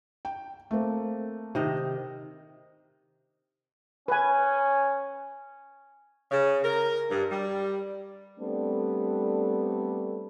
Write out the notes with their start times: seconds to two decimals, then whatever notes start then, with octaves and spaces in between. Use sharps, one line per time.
0.25 G5
0.71 A3 A#3 C4
1.55 C3 D#3 D#5
4.08 C#4 B4 G#5
6.31 C#3
6.64 A#4
7.10 G2
7.30 G3
8.38 G3 A3 B3 C4 D4 A4